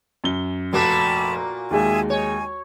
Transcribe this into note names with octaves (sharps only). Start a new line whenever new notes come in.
F#2 G7
F1 A#2 A#3 F#4 A5 B5
D#2 G#3 G#4 E5 G#5
D#4 C#5 G#5